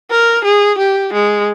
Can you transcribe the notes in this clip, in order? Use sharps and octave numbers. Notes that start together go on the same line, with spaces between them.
A#4
G#4
G4
G#3